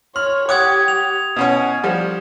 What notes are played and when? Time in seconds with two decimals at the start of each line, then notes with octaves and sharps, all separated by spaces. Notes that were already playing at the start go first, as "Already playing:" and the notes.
0.16 C#5 C6 F6
0.49 G4 C#5 F#5 D6 D#6 G#6
0.88 F7
1.36 B2 C#4 C#5 F#5
1.84 F3 G3